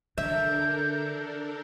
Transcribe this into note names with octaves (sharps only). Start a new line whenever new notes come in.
D3 D4 A4 A#4 E5 G6